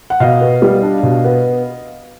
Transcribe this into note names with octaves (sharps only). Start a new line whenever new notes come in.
F#5
B2 D#5 F5
B3
G3
D4
B2
B3